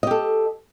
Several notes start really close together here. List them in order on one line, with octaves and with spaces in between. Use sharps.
D#5 G4 A4